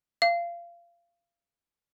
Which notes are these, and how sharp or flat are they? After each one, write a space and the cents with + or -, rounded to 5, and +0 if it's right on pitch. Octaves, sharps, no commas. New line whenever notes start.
F5 -25